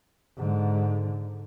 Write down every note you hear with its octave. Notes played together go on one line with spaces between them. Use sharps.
G#2 D3